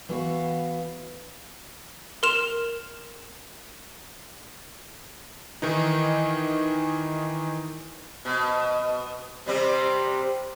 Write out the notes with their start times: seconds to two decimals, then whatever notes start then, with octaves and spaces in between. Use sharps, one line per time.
0.09 E3 B3 F#4 F5
2.23 A#4 C6 F6 E7 F7 G7
5.62 D#3 E3 D#4
8.25 B2
9.46 C3 G3 C4